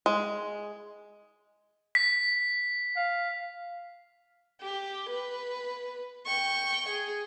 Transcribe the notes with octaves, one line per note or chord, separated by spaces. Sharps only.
G#3
B6
F5
G4
B4
G5 C#6
G#4